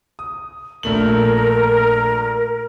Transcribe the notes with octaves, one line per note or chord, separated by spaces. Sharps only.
D#6
A#1 A3 A#4 F#7